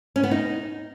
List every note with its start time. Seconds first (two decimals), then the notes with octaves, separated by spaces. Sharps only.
0.16 C#4
0.23 B3
0.31 D#4